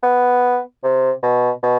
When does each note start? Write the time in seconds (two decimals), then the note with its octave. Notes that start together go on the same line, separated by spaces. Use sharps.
0.03 B3
0.83 C3
1.23 B2
1.63 B2